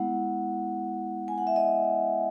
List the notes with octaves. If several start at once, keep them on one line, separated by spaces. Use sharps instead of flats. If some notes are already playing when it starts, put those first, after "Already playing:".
Already playing: G#3 B3 E4 F#5
G#5
F#5
E5
D#5